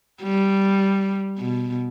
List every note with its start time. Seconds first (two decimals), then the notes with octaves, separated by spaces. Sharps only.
0.23 G3
1.38 B2